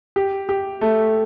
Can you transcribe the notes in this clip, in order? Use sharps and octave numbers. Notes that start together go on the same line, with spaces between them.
G4
G4
A3